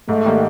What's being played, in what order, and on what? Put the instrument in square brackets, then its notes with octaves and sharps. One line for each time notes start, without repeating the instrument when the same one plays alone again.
[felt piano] G#2 [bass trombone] A3
[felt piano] D#3 G3 A#3